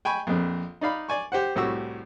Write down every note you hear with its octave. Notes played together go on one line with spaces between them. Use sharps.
G5 G#5 B5 C#6
A#1 F2
D#4 D5 F5 B5
D5 G#5 C#6
G4 C5 F#5
C2 A2 F#4 G4 C#6 E6